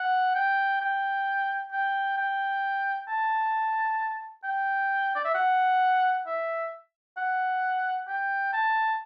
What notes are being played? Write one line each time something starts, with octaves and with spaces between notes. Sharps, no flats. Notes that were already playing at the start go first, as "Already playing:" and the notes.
Already playing: F#5
G5
G5
G5
G5
A5
G5
D5
E5
F#5
E5
F#5
G5
A5